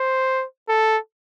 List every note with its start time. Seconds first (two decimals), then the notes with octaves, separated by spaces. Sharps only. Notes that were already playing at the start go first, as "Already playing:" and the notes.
Already playing: C5
0.69 A4